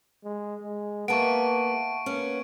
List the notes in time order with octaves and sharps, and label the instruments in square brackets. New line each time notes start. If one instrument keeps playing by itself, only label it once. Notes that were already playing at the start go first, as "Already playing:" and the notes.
[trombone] G#3
G#3
[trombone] A#3 [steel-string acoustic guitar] B3 G#4 E5 [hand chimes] F#5 A5 [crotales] C#6 D7
[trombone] A#3 [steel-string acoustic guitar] B3 C#4